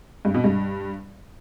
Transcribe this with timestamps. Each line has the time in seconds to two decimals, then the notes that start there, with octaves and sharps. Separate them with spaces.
0.25 G2
0.34 B2
0.44 G2